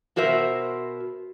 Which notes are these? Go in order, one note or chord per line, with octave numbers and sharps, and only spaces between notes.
B2 F#4 A#4 C5 E5